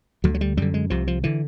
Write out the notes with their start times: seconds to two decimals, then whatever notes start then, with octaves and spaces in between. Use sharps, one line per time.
0.24 D2 D3 F#3
0.34 F#3
0.41 G3
0.57 F#2 D3 G3
0.74 G#3
0.90 C2 C3 F3
1.07 F3
1.24 D3 E3